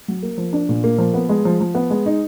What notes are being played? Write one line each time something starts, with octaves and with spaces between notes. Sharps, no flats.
F#3
A#3
F3
D4
A#2
A#3
F3
B3
G#3
F3
F3
B3
G#3
D#4